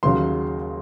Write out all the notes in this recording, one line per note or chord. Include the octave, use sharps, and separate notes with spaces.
D#2 C#3 F#3 C6